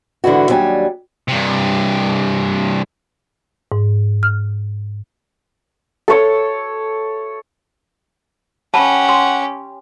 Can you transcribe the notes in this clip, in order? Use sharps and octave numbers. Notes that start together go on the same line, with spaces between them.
G#2 D3 E3 E4 F#4
D#2 F#3 G3 D4 G#5
G2 C3
G#2
F6
A4 C#5
C#4 G4 F#5 A5 B5
C6